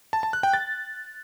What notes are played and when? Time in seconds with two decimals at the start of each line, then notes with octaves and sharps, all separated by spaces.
0.13 A5
0.23 A5
0.33 F#6
0.43 G5
0.53 A6